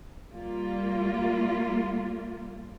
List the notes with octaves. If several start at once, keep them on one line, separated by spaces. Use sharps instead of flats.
G3 A#3 F4